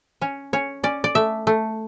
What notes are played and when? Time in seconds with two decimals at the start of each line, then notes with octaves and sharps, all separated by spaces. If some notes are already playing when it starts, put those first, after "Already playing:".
0.21 C#4 C#5
0.53 C#4 C#5
0.83 C#4 D5
1.04 D5
1.15 A3 E5
1.47 A3